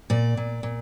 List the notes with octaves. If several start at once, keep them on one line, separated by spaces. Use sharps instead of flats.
A#2 D5
A#2
A#2